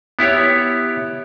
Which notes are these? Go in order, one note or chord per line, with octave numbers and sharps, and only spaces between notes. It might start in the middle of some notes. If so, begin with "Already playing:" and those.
B3 E4 G4 C#5